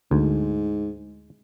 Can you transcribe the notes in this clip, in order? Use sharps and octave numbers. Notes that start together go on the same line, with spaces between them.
D2 G#2